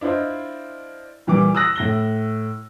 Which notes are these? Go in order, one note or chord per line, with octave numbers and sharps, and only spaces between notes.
D4 E4 F4 C5 D#5
A#2 E3 G3 D6
D#6 E6 F#6 A#6
A2 A#6 G7